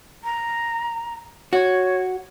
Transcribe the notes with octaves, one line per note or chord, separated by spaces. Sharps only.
A#5
F#4 C#5